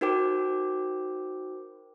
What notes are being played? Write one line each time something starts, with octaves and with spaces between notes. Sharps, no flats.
D#4 F#4 A#4 C5 G5 D6